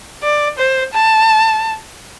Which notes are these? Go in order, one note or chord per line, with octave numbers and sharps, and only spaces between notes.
D5
C5
A5